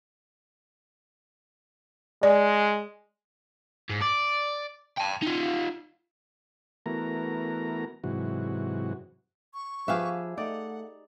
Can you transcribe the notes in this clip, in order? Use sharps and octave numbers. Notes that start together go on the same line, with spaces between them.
G#3 D5
G#2
D5
G5 A5
D#4 F4
E3 A3 B3 F#4 A#4 A#5
G#2 C3 E3 F#3 F#4
C#6
F3 G4 G#4 B4 E5 F5
A3 D#4 D5 F#5